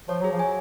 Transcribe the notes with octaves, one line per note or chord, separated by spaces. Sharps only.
F3 C#5
F#3 G#4
F3
F#3 G#5